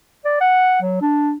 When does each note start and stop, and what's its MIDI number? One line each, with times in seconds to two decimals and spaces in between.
0.25 0.40 74
0.40 0.81 78
0.82 0.97 54
1.01 1.34 62